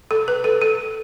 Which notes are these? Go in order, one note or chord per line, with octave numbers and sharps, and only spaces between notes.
A4
B4
A4
A4